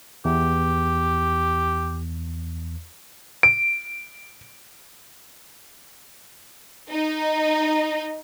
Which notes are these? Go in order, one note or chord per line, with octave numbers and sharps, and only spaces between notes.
E2 G4
D7
D#4